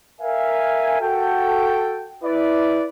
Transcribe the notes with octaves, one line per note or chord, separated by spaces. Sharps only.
A#4 E5 F5 G#5
F#4 A4 G5
E4 B4 D5